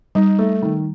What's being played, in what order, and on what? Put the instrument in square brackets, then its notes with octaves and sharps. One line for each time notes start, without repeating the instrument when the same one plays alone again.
[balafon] G3 [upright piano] D#4
[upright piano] A3
D#3